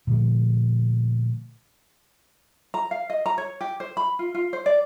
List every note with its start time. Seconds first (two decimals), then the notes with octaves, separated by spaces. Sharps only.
0.07 A#2 D3 F3 A3
2.74 A#5
2.91 F5
3.10 D#5
3.26 A#5
3.38 C#5
3.61 G4
3.80 C5
3.97 B5
4.19 F4
4.34 F4
4.53 C5
4.66 D5